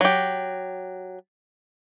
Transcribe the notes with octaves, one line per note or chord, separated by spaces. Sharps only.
F#3 G4